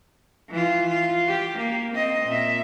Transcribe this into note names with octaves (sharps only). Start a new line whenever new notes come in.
E3 F4
F4
G4
A#3
C4 D#5
A#2 E5